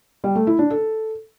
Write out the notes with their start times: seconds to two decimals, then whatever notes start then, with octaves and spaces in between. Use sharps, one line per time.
0.24 G3
0.35 A3
0.47 E4
0.59 D4
0.70 A4